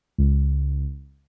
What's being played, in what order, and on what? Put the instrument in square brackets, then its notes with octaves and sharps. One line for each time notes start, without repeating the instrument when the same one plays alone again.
[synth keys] C#2